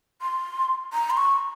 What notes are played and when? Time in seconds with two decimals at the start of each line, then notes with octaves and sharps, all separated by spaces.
0.22 C6
0.93 A#5
1.10 C6
1.17 C#6